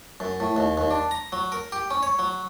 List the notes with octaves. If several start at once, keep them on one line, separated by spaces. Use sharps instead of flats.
F#2
A2
D#2
D#2
D4
A#5
F#3
A#4
G4
C#4
C#5
F#3